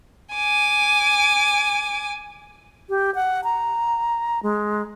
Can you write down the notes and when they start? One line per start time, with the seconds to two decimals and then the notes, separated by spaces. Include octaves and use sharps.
0.34 G#5 D6
2.89 G4
3.15 F#5
3.44 A#5
4.43 G#3